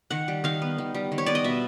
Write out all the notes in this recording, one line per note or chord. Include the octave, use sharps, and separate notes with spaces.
D#3 F#5
G3
D#3 F5
B3
D#3
G3
D#3
C#5
B3 D5
D#5
B2 E5